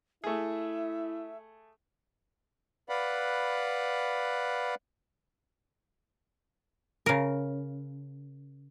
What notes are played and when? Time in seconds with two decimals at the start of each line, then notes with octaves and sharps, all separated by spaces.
0.24 A3 E4 G#4 E5
2.89 B4 D5 F5 F#5 B5
7.06 C#3 A#4